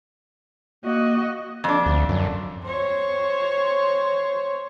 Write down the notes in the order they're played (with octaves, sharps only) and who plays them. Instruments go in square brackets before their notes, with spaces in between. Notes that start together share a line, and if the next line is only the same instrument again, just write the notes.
[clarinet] A#3 [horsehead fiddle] F#4 D#5
[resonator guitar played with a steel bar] F2 D4
[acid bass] D2
F#2
[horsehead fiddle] C5 C#5